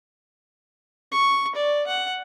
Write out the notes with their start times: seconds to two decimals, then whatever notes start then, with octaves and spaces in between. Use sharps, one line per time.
1.12 C#6
1.55 D5
1.87 F#5